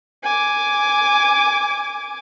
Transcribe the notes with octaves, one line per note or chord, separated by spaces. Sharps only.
G#5 D6